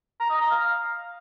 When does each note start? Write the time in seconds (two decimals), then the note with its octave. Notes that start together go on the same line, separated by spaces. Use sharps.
0.20 A#5
0.30 D#5
0.41 A#5
0.51 F5